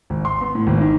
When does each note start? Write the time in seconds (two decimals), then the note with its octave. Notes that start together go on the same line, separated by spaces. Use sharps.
0.10 G#1
0.25 C6
0.41 B3
0.55 A2
0.67 G#1
0.80 D#3